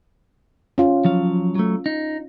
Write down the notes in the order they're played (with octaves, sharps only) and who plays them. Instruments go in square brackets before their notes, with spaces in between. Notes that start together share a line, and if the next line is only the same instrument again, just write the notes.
[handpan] C#4 F4
[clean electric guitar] F3 F#3 F5
F#3 A3
D#4